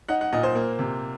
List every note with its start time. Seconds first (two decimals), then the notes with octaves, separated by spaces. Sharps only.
0.09 D#4 F#5
0.21 F#5
0.33 A#2 D#5
0.43 C5
0.55 A#3
0.79 C3